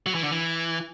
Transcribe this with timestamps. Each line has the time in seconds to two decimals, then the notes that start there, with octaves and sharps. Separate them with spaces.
0.06 F#3
0.15 E3
0.22 D3
0.31 E3